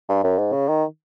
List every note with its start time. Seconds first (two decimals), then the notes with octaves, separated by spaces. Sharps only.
0.09 G2
0.24 F#2
0.38 G#2
0.52 C#3
0.68 D#3